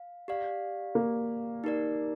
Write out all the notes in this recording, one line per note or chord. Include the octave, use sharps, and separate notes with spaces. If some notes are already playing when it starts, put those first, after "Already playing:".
Already playing: F5
G4 D5 F5
A#3
D#4 G4 A#4 D5